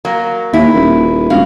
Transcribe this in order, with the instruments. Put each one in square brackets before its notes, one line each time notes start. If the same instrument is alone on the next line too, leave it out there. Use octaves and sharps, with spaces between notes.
[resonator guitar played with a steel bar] F#3 A#3
[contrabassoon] D#2 [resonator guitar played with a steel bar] E4
[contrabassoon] D#1
[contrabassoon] E1 [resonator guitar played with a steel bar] F#4 F5